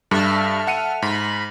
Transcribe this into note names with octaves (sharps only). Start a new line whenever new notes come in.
G2 G3 A4 E5 F6
F#5 C#7 D#7
G#2 B5